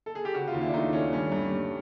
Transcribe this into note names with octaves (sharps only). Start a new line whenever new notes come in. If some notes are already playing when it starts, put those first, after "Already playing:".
A4
G#4
G4
C#3 F#4
F4
D#2
E4
D4
A3 D#4
A3 C#4
G2 C#4
G2
G2